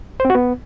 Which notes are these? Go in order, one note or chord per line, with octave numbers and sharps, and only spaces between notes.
C5
C4
F#4
B3